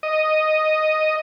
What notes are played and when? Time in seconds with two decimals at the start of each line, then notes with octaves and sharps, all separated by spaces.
0.03 D#5